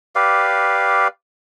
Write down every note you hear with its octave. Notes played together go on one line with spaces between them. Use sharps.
G4 B4 D5 F5